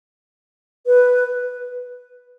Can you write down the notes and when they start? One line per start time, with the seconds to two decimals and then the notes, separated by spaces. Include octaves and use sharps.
0.87 B4